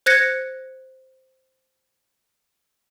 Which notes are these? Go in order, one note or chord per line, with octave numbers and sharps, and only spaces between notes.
C5 F#6 G#6 A#6 C#7